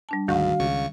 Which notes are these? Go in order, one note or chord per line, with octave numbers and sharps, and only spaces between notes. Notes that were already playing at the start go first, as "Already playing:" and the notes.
G3 D4 A5
D2 G#2 D#3 F#4 F5
C#2 C#3 C#6